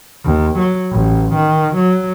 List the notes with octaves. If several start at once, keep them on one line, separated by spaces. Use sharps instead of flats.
D#2
F#3
A1
D#3
F#3